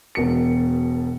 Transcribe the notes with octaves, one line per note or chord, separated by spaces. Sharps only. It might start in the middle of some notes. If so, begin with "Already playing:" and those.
E1 B2 A#4 C#7